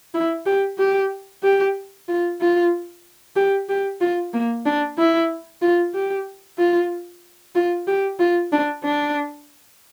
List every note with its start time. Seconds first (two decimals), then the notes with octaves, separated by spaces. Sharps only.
0.14 E4
0.46 G4
0.78 G4
1.43 G4
2.08 F4
2.41 F4
3.36 G4
3.69 G4
4.01 F4
4.33 A#3
4.65 D4
4.98 E4
5.62 F4
5.94 G4
6.58 F4
7.55 F4
7.87 G4
8.19 F4
8.52 D4
8.84 D4